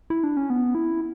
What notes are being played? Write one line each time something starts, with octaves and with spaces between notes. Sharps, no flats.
E4
D4
C#4
B3
E4